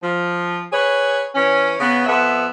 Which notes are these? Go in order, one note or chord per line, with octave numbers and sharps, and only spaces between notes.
F3
G#4 B4 C#5
E3 C#4
C#3 B3
F2 B3 E5